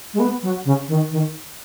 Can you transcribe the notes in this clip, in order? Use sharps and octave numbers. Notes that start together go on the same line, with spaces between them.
G#3
B3
F#3
C#3
D#3
D#3